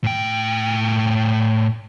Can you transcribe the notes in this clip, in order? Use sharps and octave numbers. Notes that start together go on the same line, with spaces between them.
A2 G5